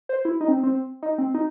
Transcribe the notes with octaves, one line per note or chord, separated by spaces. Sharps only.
C5
E4
D#4
C4
C4
D#4
C4
D#4